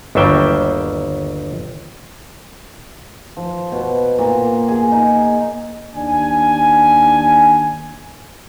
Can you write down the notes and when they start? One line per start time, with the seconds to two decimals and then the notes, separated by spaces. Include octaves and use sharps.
0.15 G1 D#2 F#3 G3 E5 G5
3.37 F3
3.72 B2
4.18 A#2
4.68 G#4
4.91 D#4
5.95 D#2 D4 G#5